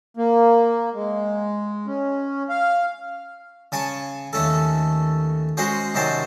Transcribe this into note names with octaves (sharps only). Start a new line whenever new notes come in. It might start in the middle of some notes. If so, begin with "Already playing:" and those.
A#3
G#3
C#4
F5
C#3 G#5 A5 C#6
D#2 A3 C#4 A4
G#3 C#4 F#4 C5 C#5
C3 D#3 F#3 C#4 C5 A5